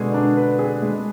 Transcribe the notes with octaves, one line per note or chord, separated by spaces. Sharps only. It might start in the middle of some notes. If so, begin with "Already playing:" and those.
Already playing: B2 D3 G#3 G#4
D4
B4
G#4
G#3